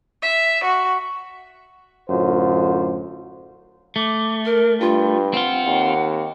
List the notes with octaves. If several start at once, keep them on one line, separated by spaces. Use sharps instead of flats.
E5
F#4
F#2 A2 D3 F4 C5
A3 D6
A#4
G2 F4
C4 F4 F#5
D#2